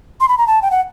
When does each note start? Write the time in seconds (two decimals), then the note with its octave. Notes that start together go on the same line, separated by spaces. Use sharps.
0.21 C6
0.29 B5
0.38 A#5
0.47 A5
0.62 G5
0.71 F#5